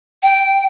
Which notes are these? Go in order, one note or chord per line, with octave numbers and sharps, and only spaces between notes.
G5